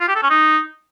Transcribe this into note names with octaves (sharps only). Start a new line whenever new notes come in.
F4
G4
A4
C#4
D#4